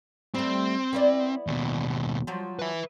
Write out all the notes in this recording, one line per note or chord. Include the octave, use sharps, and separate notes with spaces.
G3 A3 C4
B3 E4 D5
D#2 B2
F3 F#3
B4 E5